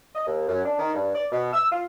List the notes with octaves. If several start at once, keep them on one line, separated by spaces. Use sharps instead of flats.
D#5
D#2
F#2
D4
D#3
G2
D5
B2
E6
F4